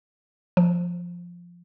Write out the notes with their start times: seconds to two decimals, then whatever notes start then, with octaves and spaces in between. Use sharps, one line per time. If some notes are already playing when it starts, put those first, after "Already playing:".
0.57 F3